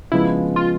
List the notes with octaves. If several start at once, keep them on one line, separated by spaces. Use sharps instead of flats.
C#3 F3 G#3 B3 E4
F4